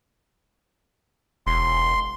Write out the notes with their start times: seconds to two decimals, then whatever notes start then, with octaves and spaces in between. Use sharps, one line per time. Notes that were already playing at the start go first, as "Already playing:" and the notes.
1.47 E1 C6